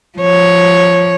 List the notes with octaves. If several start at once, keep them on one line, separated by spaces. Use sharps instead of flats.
F3 C#5